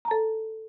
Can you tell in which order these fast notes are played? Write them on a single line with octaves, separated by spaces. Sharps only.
A#5 A5 A4